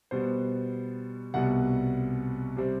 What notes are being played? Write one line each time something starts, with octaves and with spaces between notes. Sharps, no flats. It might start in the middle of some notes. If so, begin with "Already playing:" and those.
B2 G3 B3 C5
C2 B2 G3 B3 F#5
C3 G3 C4